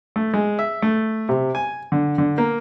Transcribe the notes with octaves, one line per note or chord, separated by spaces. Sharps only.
A3
G#3
E5
A3
C3
G#5
D3
D3
A#3